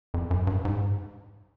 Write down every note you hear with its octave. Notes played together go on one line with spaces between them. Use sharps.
F2
F#2
G2
G#2